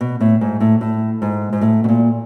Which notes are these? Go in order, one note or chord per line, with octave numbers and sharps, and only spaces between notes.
B2
A2
G#2
A2
A2
G#2
G#2
A2
B2
A#2